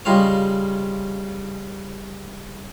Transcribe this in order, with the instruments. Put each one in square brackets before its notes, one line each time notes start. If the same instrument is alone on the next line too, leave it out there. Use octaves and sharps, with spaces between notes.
[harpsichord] C#3 G3 D#4 F4 C#5